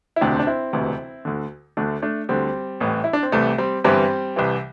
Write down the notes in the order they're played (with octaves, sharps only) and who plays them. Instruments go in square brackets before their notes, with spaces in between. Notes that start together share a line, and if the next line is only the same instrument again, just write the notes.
[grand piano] E4
E1 D2 C3 D4 G4
C4
D4
C4 E4
E1 D2 C3 E3
D2 D3
D2 D3 A3 D4
A3 D4
D2 D3 G3 C4
A1 A2 E3
E4
D4
C4
C2 C3 E3 A3
G3 C4
G1 G2 E3 G3 C4
C2 C3 E3